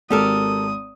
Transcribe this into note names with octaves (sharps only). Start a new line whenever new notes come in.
G#1 G4 A4 A#4 D#6